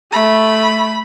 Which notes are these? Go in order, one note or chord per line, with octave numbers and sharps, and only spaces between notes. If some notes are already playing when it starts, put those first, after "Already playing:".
A3 B5